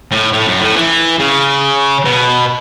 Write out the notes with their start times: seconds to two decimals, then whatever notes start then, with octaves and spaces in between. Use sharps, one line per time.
0.11 A2
0.33 A2
0.47 F#2
0.61 A2
0.76 E3
1.19 C#3
2.05 B2